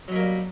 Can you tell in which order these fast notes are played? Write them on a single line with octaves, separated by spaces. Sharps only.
F#3 B2 A#3 G3